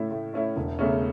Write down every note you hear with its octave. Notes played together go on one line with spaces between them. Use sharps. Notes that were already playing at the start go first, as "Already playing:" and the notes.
Already playing: A2 A3 C#4 E4
A2
A3 C#4 E4
E1
E2 C#3 A3 C#4